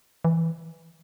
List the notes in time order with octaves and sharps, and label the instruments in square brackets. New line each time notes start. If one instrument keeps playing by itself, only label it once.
[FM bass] E3